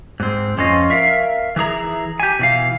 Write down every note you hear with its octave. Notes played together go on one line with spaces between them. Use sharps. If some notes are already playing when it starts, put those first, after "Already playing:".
G#2 C4
F2 C#4 F4 D#5
A#4 E5 F5
E3 E4 G#4 A#5
G4 G#5
B2 E3 F5